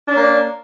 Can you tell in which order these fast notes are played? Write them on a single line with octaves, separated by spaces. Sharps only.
D4 C#4 A#3 D5